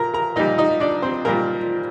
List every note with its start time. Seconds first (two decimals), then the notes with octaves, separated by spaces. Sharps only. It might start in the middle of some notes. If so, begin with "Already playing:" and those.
Already playing: A#2 A#4 A#5
0.14 A#4 A#5
0.36 A#2 D#4 D#5
0.39 G3
0.58 D#4 D#5
0.80 D4 D5
1.02 C4 C5
1.25 A#2 G3 A#3 A#4